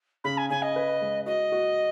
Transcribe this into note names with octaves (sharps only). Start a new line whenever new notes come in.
C#3 B5
G#5
C#3 G#5
D#5
B4
G#3
F#4 D#5
F#4